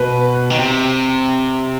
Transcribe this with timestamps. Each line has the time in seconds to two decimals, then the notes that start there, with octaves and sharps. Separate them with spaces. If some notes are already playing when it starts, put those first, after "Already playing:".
Already playing: B2 B4
0.50 D#3
0.59 C3